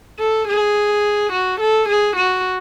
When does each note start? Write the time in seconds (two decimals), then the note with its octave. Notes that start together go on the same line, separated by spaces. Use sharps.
0.19 A4
0.47 G#4
1.32 F#4
1.60 A4
1.88 G#4
2.16 F#4